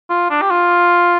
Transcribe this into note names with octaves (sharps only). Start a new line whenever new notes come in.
F4
D4
G4
F4